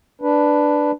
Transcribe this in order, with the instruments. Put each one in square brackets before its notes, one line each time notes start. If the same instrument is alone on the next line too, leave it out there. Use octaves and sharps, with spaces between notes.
[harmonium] D4 B4